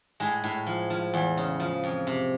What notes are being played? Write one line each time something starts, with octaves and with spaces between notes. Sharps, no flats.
A2 G#3
A2
F3
F3
E2
C#3
F3
F2
C3